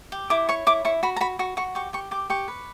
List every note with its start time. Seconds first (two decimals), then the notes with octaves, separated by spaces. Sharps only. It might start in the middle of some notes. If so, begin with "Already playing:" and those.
0.12 G4
0.30 E4 D6
0.49 C#5 C#6
0.67 E4 D6
0.85 E4 C#6
1.03 F#4 B5
1.16 A#5
1.21 F#4 B5
1.39 F#4 C#6
1.57 F#4 C#6
1.75 G4 C#6
1.93 G4 C#6
2.11 G4 D6
2.30 G4 C#6
2.48 B4